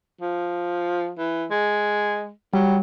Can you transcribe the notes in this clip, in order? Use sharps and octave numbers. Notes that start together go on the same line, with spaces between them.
F3
E3
G#3
F#3 G3